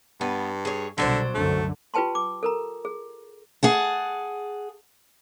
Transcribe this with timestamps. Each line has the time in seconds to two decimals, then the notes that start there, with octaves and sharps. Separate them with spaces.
0.21 G2 B3
0.65 G#4 C#5
0.98 C2 B2 D3 F#3 D4 C5
1.35 C2 F#2 D3 A3
1.94 F4 G4 B4 G5 A5 C6
2.15 D6
2.43 A4 A#4 A#5
2.85 G#4
3.63 G#4 F#5 A5